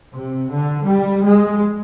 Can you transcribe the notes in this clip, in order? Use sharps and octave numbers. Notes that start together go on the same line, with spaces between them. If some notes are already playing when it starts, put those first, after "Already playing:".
C3
D3
G3
G#3